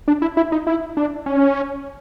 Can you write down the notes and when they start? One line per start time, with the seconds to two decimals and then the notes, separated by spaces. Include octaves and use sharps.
0.08 D4
0.22 E4
0.37 E4
0.52 D#4
0.67 E4
0.97 D4
1.26 C#4